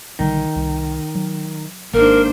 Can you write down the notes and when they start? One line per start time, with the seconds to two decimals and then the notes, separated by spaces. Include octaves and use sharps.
0.19 B1 D3 D#3 G3
0.56 C2
1.15 F#3
1.94 G#1 G#2 A#3 D4 A#4 C5